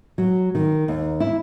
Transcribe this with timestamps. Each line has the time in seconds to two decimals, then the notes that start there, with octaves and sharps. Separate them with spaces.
0.18 F#3
0.55 D#3
0.88 D#2
1.20 E4